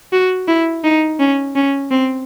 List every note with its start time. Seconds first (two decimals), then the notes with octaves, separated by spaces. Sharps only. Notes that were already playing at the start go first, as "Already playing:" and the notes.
0.13 F#4
0.48 E4
0.84 D#4
1.20 C#4
1.56 C#4
1.91 C4